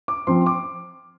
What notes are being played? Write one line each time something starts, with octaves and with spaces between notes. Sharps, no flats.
D6
F3 C4 C6
D6